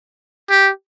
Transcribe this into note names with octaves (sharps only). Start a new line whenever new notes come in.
G4